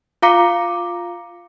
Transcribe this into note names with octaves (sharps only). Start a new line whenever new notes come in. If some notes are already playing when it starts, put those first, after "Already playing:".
F4 F5 A#5 D6 C#7